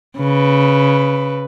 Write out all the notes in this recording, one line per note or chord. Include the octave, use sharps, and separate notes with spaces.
C#3 B4